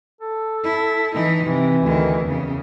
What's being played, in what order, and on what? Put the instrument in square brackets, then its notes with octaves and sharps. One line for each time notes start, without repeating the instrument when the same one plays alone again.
[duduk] A4
[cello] E4
E3 D#4
[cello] C3 [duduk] E3
[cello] D2 D#3
E2 C#3